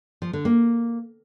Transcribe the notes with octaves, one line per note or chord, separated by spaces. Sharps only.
F3
D3
A#3